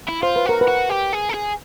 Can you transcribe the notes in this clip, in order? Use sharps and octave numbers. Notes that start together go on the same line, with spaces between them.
E4
F4 C5
B4
F#4 A#4
B4
F#4
G4
G#4
A4
G#4